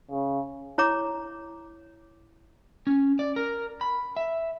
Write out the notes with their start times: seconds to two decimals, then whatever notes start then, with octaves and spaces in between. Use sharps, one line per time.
0.11 C#3
0.78 E4 C#5 A#5 D6
2.87 C#4
3.19 D5
3.36 A#4
3.81 B5
4.16 E5